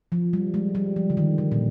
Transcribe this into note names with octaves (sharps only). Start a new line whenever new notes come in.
F3
G3
G#3
G3
F3
D3
D#3
D3
A#2